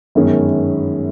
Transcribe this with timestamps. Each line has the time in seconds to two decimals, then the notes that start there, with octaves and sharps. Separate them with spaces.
0.15 G1 F#2 D#3 G#3 C#4